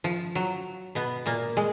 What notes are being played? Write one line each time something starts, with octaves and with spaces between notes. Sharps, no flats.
F3
F#3
B2 B3
A#2 A#3
G#3